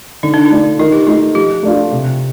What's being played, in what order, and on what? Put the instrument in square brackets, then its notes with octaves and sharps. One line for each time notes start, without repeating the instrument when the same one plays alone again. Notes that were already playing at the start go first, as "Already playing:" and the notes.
[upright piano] D3 [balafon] D#4
[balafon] D4
D#4
[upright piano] A3 D4 F4
[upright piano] D#3 [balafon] F4
[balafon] G4
[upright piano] A3 D#4 [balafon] F4
[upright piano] F3 [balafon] G4
[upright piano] A3 D4 F4
C3